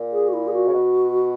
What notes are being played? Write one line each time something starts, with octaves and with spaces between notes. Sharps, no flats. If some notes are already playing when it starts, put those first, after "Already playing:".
Already playing: A#2
G#4
F#4
E4
G#4
F#4
C#3
B2